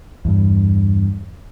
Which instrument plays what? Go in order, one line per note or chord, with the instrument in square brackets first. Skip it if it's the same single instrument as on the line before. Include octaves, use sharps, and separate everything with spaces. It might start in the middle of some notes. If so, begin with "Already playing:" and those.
[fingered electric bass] E2 G2